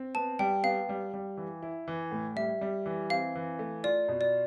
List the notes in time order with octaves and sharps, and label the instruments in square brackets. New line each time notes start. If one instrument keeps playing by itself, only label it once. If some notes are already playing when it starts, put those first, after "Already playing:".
Already playing: [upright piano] C4
[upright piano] B3 [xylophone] A5
[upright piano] G3 [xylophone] G5
[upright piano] B3 [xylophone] F5
[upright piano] G3
G3
E3
E4
E3
A2
[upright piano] G3 [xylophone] E5
[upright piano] G3
E3
[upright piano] C4 [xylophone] F5
[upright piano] E3
A3
[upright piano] F4 [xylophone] D5
[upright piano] B2
[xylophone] D5